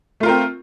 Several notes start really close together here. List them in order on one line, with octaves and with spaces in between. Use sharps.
A3 F4 A#4 C4